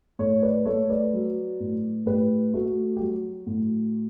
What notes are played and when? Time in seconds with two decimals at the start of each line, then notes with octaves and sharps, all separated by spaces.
0.19 A2 A4 C#5
0.42 B4 D5
0.65 A3 A4 C#5
0.90 B4 D5
1.13 F#3
1.60 A2
2.06 A2 G4 B4
2.53 A3 F#4 A4
2.97 G4
3.01 F#3 F#4
3.46 A2